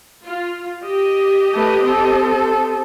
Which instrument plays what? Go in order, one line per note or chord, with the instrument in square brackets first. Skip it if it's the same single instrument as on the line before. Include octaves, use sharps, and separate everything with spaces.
[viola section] F4
G4 D#5
[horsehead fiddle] A3 B4
C4 A4